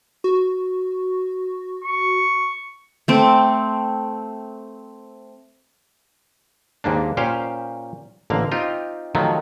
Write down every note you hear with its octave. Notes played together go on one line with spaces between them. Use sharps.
F#4
C#6
A3 C4 D6
D#2 G#2 A#3 D4
A#2 C#4 G4 C5 F5
A1 D3 A#3 F5
C4 D#4 F4 G4
C3 D#3 F3 F#3 A3